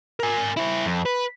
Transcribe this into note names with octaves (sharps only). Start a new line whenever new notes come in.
A#4 G#5
E4 C5
F2
B4